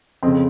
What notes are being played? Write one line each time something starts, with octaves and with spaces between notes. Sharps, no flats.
F2 C#3 C4